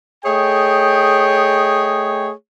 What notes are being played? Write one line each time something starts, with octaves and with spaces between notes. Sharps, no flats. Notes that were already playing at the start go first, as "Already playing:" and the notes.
A3 G#4 C#5 D#5 G5